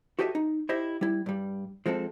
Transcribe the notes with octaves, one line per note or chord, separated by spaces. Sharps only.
F#4 G4 A4 B4 D#5 E5
D#4
E4 G4 C5 D#5 E5
G3 E4
G2 G3
F3 G#3 C4 A4